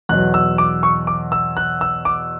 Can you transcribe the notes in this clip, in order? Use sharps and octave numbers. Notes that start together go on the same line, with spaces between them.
E2 B2 F#3 F#6
E6
D6
C#6
D6
E6
F#6
E6
D6